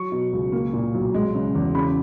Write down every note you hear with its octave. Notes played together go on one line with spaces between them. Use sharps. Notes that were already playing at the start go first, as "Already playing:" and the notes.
Already playing: F#3 C#6
B2
C#2
A#3
A#2
B1
G#3
C#3
E2
C#3 B5